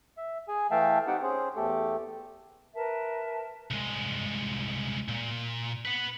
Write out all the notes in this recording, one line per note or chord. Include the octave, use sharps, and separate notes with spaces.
E5
G#4 G#5
E3 A3 E5 F5 G5 A5
C4 D#4 G4 F#5 G5
C#4 G#4 C5
E2 A3 G4 A4
A#4 B4 E5 A5
C2 G#3
A#2
B4 F#5